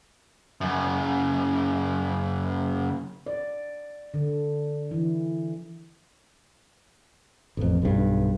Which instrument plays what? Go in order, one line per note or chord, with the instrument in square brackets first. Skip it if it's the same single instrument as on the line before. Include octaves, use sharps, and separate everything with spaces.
[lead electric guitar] F#2 C#3
[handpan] D5
D3
E3
[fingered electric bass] A1 F2
B1 G2